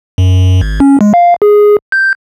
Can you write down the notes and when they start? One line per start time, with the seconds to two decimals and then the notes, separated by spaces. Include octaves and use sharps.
0.18 F#2
0.61 G#1
0.80 C#4
1.01 G#3
1.14 F5
1.42 G#4
1.92 G6